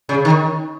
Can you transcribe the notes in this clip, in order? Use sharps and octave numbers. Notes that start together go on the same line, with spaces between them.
C#3
D#3